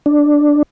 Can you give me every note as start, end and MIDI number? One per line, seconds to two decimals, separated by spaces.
0.06 0.63 62